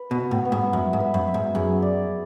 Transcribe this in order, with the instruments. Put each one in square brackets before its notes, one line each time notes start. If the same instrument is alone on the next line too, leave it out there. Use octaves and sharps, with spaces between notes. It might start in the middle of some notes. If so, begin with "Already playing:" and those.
Already playing: [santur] B4
[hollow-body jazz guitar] B2
[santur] F#4
[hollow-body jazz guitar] A2
[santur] B3
[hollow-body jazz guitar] G#2
[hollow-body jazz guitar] F#2 [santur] E5
[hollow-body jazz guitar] G#2
[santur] B4
[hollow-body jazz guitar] F#2
[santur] E5
[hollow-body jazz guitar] G#2
[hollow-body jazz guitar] F#2 [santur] G#4
[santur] D5